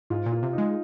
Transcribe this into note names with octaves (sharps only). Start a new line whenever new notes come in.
G#2 F4
A#2
F4
C3
D#4
G#3